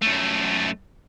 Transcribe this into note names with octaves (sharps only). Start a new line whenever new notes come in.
F#2 A3